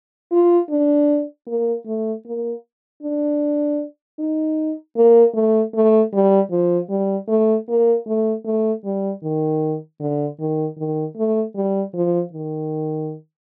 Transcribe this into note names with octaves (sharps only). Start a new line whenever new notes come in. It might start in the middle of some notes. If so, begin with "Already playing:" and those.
F4
D4
A#3
A3
A#3
D4
D#4
A#3
A3
A3
G3
F3
G3
A3
A#3
A3
A3
G3
D#3
D3
D#3
D#3
A3
G3
F3
D#3